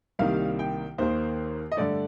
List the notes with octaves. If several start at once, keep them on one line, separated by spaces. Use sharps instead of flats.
C2 C3 D#3 G3 A#3 F5
G5
D#2 D#3 A#3 C5
D#5
G2 D3 A3 D5